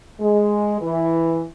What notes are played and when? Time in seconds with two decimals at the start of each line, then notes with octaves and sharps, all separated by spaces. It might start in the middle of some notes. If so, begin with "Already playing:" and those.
0.20 G#3
0.80 E3